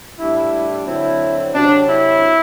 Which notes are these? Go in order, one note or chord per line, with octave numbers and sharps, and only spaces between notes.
A2 G3 D4 E4
D3 F#3 C4 E4
C3 F#3 C4 D4
E4